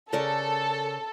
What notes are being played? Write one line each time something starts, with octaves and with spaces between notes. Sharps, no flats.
C#3 A4 A#4 D5